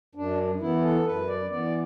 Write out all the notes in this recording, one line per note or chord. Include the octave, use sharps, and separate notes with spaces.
F#2 D4
E3 B3 E4
A4
F#2 B4
D5
E3 B3 D5